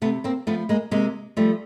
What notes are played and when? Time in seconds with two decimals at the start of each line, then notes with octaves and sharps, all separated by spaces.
0.02 C3 A3 B3
0.24 A#3 C4
0.47 F3 A3 B3
0.69 G#3 A#3
0.91 C3 G#3 A#3
1.37 F3 G3 A3